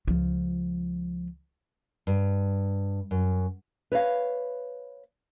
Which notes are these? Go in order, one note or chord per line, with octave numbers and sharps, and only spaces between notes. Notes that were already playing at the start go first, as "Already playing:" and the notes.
C#2 F3
G2
F#2
B4 C#5 E5 F5